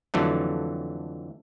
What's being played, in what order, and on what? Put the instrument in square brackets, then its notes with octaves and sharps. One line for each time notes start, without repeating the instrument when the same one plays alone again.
[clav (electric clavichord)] F2 D3 E3 F#3 A3